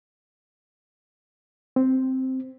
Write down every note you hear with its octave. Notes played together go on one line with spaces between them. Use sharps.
C4